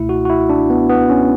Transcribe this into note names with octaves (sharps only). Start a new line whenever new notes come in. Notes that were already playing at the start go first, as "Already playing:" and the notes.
Already playing: C#2 B2 A3 E4
F#4
F#4
E4
D4
B3
B3
C#4